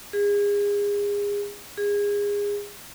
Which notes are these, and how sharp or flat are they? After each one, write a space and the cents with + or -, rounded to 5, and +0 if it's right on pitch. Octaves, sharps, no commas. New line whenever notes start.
G#4 -30
G#4 -25